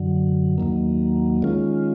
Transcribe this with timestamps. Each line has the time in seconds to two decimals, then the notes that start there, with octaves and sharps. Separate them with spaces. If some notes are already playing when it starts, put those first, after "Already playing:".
Already playing: F#2 D3 F#3
0.58 D#2 D#3 F#3 A#3
1.42 D#3 G#3 C#4 F4